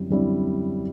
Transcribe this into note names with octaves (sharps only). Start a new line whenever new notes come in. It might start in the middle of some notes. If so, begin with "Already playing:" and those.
Already playing: F#2 D3 G3 C4 E4
F#2 D3 G3 C4 E4